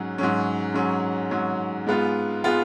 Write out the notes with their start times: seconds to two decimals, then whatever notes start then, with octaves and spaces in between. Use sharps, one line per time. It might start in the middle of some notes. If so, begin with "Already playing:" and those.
Already playing: G#2 F#3 C#4
0.18 G#2 F#3 C#4
0.74 G#2 F#3 C#4
1.31 G#2 F#3 C#4
1.87 G#2 G#3 B3 F4
2.44 G#3 B3 F4